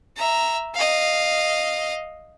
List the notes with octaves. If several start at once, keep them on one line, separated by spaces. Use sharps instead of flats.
E5 A#5
D#5 F5